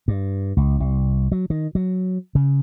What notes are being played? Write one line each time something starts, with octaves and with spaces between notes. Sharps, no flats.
G2
C#2
C2
F#3
D#3
F#3
C#3